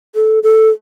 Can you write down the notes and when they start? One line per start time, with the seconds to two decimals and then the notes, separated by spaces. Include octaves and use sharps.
0.15 A4
0.43 A4